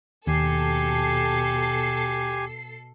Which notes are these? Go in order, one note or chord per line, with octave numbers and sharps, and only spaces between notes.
D#2 B2 G4 A4 G#5 C7